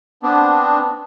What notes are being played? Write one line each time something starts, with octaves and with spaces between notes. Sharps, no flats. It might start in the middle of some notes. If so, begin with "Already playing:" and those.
B3 C4 D4